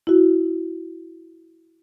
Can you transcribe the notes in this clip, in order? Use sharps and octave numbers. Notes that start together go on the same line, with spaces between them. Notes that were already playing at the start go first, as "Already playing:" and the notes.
E4 F#4